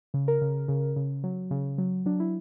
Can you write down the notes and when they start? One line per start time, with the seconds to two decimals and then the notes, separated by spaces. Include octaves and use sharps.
0.14 C#3
0.28 A#4
0.41 C#3
0.68 C#3
0.96 C#3
1.24 F#3
1.51 C#3
1.78 F#3
2.06 F#3 D4
2.20 E4